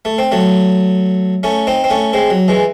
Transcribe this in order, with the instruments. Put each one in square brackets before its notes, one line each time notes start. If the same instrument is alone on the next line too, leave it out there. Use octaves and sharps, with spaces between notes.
[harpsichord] A3
C4
F#3 A3
A3 C#4
C4 D#4
C4
A3 C#4
G#3 C4
F#3
E3 G#3